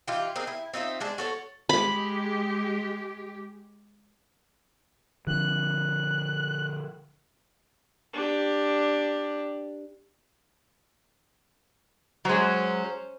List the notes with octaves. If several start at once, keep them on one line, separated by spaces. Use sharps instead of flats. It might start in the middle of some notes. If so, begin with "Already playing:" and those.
E3 D#4 F4 G4
C4 D#4 G#4 A#4
E4
C4 D#4 F4 E5
G#3 D4 A5
F#4 A4 C#5
G#3 G4 B5
D3 F3 F#6
D4 G4
F#3 G#3 C#4 C5